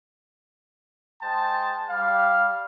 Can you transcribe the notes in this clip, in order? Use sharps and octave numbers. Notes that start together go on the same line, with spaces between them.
G#3 C5 G5 A5
G3 F5